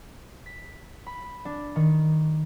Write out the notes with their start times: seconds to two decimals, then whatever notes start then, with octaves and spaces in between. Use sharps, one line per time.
0.46 B6
1.06 B5
1.45 D4
1.76 D#3